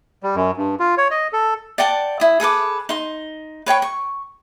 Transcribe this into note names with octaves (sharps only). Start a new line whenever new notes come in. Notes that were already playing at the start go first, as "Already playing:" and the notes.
G3
F#2
G2
F4
C#5
D#5
A4
D5 F#5 G5 A5
E4 D#6
G#4 A4 B4 D6
D#4 C6
B4 C#5 G5 C#6
C#6